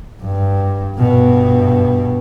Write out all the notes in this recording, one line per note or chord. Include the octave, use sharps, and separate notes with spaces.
G2
G2 B2